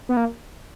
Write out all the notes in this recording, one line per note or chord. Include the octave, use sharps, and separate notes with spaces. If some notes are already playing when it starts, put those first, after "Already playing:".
B3
A#3